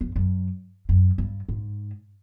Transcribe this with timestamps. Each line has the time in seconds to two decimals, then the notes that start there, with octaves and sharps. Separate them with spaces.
0.01 F2
0.16 F#2
0.89 F#2
1.18 G2
1.49 G#2